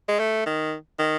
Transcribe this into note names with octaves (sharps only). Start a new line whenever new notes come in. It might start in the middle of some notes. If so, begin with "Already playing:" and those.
G#3
A3
D#3
D#3